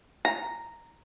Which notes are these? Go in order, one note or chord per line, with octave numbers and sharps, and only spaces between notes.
A#5